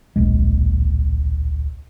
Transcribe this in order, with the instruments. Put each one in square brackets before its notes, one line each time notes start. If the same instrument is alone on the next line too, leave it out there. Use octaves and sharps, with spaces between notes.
[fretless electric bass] D1 A#1 G#3